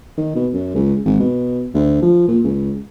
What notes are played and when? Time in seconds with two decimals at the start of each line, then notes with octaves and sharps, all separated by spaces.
0.17 D#3
0.35 B2
0.53 F#2
0.74 C#2
1.05 G#1
1.19 B2
1.74 D2
2.02 F3
2.28 A#2
2.44 C#2